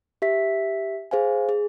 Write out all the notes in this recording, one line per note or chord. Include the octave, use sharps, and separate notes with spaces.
G4 E5 B6
G#4 C5 F5 G#5
G#4